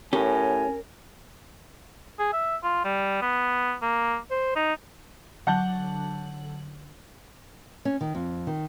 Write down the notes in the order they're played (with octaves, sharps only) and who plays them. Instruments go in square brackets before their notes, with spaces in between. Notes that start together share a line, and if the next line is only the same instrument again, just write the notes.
[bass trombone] A2 [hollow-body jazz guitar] C#4 G4 [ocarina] A#4 [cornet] G#5
[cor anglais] G#4
E5
F4
G3
B3
A#3
C5
D#4
[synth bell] D3 F#3 F#7 [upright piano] F#5 A5 G6
[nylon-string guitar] C#4
D#3
F2
D#3